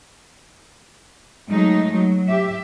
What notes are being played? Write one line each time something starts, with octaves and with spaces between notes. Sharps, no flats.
F#3 G#3 A3 D#4
F#3
G4 E5